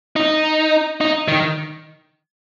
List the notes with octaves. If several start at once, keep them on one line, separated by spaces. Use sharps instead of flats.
D#4
D#4
D#3